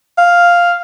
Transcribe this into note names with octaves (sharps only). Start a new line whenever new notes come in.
F5